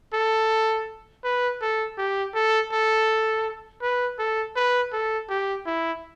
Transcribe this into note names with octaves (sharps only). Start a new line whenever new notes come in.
A4
B4
A4
G4
A4
A4
B4
A4
B4
A4
G4
E4